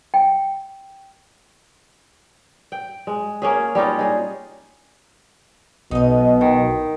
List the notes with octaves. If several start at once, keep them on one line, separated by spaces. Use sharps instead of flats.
G5
G5
G#3
A#3 C#4 G#4
G3 C#4 D#4 F4
D#4 G#4
B1 B2 D#4 D#5
D#3